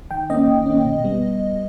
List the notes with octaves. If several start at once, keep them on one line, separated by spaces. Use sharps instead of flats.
D#3 G5
A#3 C#4 D#5
D#3
A#3 C#4
B2
G3 B3